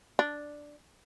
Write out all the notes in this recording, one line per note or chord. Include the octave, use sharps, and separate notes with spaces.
D4